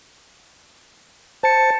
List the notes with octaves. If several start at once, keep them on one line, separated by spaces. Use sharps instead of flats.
C5 A5 C#7